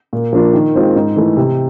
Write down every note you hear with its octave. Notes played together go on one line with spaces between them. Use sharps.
A#2
F3 A#3 D4 F4
D#3
G#3 C4 F4
G#2
E3 A3
C3